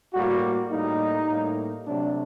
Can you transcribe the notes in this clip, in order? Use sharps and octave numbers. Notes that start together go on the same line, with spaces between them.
A2 G3 A#3 F#4
A2 G3 A#3 D#4
A2 G3 A#3
C3 F#3 A3 D4